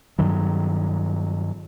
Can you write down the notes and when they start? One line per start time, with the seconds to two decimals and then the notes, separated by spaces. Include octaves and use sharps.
0.19 G2 D#3 F#3